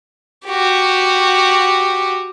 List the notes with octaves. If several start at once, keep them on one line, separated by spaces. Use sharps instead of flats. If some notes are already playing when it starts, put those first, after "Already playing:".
F#4 G4